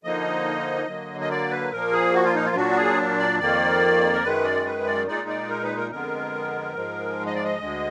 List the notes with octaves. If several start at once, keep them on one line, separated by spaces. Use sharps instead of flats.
D3 F3 A#3 D#4 D#5
D3 F#3 A#3
D#5
D5
B4
A#2 F3 A#3 A#4
G#4
F#4
F4
D#4
F4
A#2 F#3 D4 F#4
G#4
D5
F2 D#3 A#3 D5
A#4
F#2 D#3 G#3 B4
D5
B4
D5
A#2 G#3 D#4 D5
D5
A#4
B4
A#4
F2 D3 G#3 B3 A#4
G#2 F3 G#3
D#5
D5
D#5
D2 D3 G#3